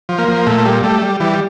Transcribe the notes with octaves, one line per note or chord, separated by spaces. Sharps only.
F3
A#3
F3
A#2 A3
G3
G3 A3
G3
E3 G3